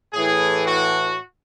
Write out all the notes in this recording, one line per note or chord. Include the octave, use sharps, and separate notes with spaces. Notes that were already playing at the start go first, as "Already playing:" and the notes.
A2 E3 G#4
F#4